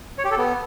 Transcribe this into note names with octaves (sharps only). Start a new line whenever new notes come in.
C#5
G4
A4
B3